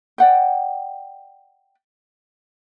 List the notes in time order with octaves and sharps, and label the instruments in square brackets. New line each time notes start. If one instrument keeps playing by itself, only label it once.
[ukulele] D5 F#5 G5